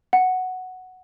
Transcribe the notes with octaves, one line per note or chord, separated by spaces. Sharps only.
F#5